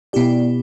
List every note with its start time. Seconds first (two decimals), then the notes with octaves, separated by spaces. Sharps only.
0.13 B2 B3 E4 G4 D5